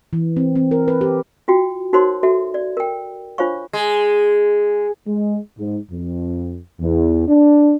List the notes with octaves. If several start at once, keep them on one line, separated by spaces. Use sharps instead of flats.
E3
C4
C4
A#4
B4
G4
F4 F#4 G5
D#4 F#4 A#4 C5 C#5 C6
F#4 A4 E5
D5
A#4 G5
D4 F4 C5 C#5 F5 C#6
G#3
G#3
G#2
F2
E2
D4